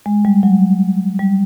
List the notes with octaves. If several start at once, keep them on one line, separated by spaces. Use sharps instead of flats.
G#3
G3
F#3
G3